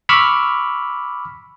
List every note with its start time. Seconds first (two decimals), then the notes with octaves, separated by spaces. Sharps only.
0.09 B5 C#6 D6 E6 F6